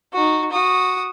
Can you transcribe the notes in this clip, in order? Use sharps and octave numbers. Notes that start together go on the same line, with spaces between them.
D#4 F#4
F#4 D#6